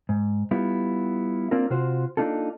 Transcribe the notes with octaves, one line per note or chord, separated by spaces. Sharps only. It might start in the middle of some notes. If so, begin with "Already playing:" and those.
G#2
G3 B3 E4 F4
A#3 C4 D4 F4 A#4
C3 F4 F#4 C5
A#3 D4 D#4 F4 A4